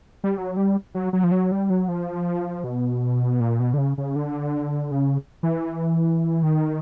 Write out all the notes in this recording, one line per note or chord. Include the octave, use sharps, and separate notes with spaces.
G3
F#3
G3
F#3
F#3
F3
F#3
G3
F#3
F3
B2
A#2
B2
D3
C#3
C#3
D3
C#3
E3
D#3